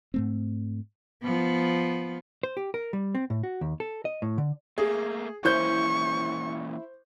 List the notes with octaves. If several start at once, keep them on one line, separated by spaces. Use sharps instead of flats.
G#2 A3 C4
F3 B3
C5
G4
A#4
G3
C4
A2
F#4
D#2
A4
D#5
A2
D3
A3 A#3 G#4
E3 A#3 C#4 E4 C5 C#6 G6